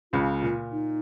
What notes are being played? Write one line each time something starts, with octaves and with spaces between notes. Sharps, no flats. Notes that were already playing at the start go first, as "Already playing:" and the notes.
C#2 C#3 F4
A#2
D#4